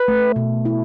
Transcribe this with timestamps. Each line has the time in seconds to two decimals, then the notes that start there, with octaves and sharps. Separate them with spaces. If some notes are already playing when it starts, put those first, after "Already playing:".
Already playing: B4
0.08 A3
0.36 B2
0.65 E4